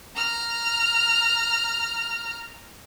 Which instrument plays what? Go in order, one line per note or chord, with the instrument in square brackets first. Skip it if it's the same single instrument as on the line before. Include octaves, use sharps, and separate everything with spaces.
[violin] A#5 F6